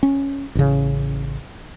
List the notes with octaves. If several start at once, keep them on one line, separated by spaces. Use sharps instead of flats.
C#4
A1 C#3